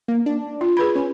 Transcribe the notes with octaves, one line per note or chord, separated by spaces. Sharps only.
A#3
D4
F4
G#4 B4 B5 G#6
C#4